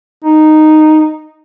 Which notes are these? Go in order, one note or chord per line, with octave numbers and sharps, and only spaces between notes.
D#4